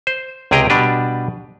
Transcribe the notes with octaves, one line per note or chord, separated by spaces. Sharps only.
C5
C#2 C3 G4 G#4 G5 A#5
B2 G3 D4 G4 B4